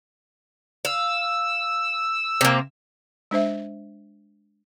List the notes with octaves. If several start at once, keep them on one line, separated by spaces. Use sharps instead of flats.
F5 E6
C3 A#3
G#3 D4 C5 E5